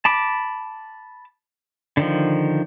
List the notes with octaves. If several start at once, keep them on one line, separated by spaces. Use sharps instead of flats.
A5 B5 D6
D3 D#3 F3